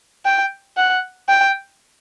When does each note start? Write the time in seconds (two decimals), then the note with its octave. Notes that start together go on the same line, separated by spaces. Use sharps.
0.25 G5
0.77 F#5
1.29 G5